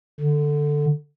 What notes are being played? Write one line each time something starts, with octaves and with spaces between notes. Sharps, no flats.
D3